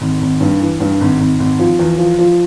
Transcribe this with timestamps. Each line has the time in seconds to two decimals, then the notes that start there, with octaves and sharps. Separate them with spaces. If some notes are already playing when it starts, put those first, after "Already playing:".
0.01 G#1
0.21 G#1
0.41 G2
0.61 E3
0.80 G2
1.01 G#1
1.20 G#1
1.40 G#1
1.59 F3
1.79 E2
1.98 F3
2.19 F3